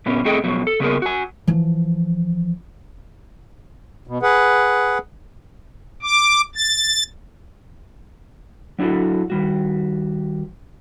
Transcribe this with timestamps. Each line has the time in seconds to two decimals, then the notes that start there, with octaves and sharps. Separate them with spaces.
0.06 A#2 B3 C#4
0.25 A2 C4 G#4 A4 D#5 G5
0.44 F2 B2 F#3
0.67 A4
0.80 C#3 A#3 B3 G4 G#4 A#4
1.02 F#4 G#5
1.47 E3 F3
4.07 B2
4.22 G#4 B4 F#5
6.03 D6
6.55 A6
8.79 F#3 D4 E4 F#4 A4
9.30 D#3 G3 F#4